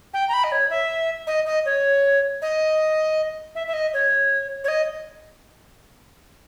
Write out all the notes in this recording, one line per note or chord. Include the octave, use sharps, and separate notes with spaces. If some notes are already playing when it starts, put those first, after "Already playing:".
G5
A#5
B5
D#5
C#5
E5
D#5
D#5
C#5
D#5
E5
E5
D#5
C#5
C#5
D#5